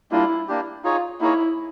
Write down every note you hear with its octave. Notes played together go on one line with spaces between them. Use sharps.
G3 A#3 D4 E4 F4
A#3 D4 G4
D#4 F4 G#4 C#5
A#3 D#4 E4 G#4 C#5